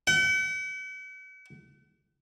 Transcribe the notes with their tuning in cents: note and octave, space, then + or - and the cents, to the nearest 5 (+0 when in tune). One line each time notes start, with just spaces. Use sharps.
F#5 +45